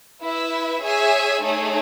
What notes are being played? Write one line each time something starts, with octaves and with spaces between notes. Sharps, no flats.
E4 B4 E5
G#4 C#5 E5 G#5
A3 D#4 G#4 C#5